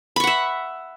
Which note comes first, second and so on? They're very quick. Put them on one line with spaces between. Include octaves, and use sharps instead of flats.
B5 C#6 F#5 E5